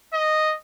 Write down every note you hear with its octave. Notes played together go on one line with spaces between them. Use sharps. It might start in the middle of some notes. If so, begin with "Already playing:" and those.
D#5